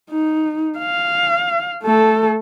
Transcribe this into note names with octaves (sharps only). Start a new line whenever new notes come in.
D#4
F5
A3 A4